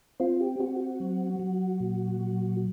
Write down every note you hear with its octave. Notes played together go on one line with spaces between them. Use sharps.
C4 F4
G4
C4 F#4
F#4
F#3
F#3
A#2
F#3